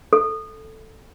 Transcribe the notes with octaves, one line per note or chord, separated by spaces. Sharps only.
A4